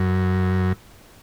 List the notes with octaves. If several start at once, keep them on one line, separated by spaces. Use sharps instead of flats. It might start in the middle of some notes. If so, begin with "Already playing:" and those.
Already playing: F#2